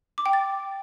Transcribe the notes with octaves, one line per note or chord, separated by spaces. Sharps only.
D6
G5
A6